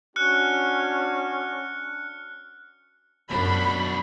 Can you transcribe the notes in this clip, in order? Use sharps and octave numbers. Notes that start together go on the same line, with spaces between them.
C#4 D4 F#4 F6 F#6 C#7
F#2 B2 D4 B5